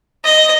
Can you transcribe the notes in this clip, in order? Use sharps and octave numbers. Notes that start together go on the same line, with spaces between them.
D#5